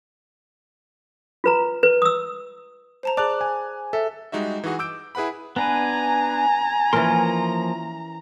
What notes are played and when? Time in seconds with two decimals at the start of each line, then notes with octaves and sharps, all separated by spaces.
1.44 F4 B4 A#5
1.83 B4
2.02 D#6 E6
3.03 C5 A5 A#5
3.17 G#4 D5 A5 D6 F#6
3.41 G#5
3.93 A4 E5
4.32 G3 G#3 D#4 F#4 E5
4.64 E3 D#4 F#4 G#4 F#5
4.79 D6 E6 G6 D7
5.15 E4 G#4 B4 F#5 B5
5.56 B3 D4 B4 G#5 A#5
6.93 E3 F3 A#3 C#4 A#4 C6